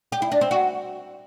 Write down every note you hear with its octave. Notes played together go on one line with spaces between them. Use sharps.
G4
E4
D4
C4
F#4